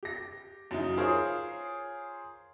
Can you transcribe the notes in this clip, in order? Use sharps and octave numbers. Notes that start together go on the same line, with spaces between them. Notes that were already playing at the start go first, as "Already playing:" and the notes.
G4 A#6
F#2 C#3 D#4 E4
F4 G#4 A#4 C5 C#5 D#6